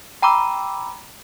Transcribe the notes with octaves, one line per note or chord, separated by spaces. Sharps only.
G5 A#5 B5 D6 E6